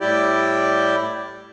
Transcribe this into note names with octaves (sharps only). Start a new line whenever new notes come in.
A2 G3 E4 G4 D5